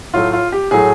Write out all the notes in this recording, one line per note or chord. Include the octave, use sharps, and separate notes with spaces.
A2 F#3 A3 F4
F4
G4
A2 F#3 A3 G#4